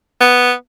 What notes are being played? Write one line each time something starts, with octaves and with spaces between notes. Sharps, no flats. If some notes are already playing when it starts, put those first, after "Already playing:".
B3